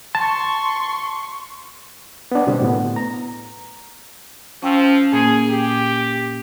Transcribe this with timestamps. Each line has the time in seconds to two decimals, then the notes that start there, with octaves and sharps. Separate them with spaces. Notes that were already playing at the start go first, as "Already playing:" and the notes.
0.15 A5 C6 C#6
2.32 B3 D4
2.47 B2 D3 G3 C4
2.61 A2 B3
2.96 A#5
4.63 F3 C#4 G5 E6
5.12 A#2 A#3 G#4
5.50 G4